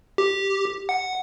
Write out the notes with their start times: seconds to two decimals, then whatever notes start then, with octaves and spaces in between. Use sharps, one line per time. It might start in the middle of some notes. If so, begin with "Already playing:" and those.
0.18 G4
0.89 F#5